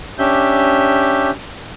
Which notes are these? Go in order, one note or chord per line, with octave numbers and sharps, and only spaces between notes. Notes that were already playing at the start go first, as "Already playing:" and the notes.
C#4 D4 G4 E5 G6